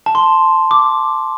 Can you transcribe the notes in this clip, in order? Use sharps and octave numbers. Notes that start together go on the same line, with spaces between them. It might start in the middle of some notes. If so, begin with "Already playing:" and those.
A5
C6
D6